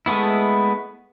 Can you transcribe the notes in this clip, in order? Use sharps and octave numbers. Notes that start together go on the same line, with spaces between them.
G#3 A3 B3 E4